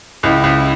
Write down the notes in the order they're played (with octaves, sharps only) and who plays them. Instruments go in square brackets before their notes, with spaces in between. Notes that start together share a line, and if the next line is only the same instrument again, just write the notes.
[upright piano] C#2 [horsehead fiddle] E4
[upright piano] C#2